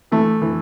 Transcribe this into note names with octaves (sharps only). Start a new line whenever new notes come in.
E3 A3
E3